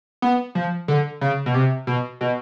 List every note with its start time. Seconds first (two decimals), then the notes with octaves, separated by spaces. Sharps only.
0.22 B3
0.55 F3
0.88 D3
1.21 C#3
1.46 B2
1.54 C3
1.87 B2
2.21 B2